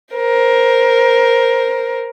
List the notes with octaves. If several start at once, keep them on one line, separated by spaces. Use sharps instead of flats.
A#4 C5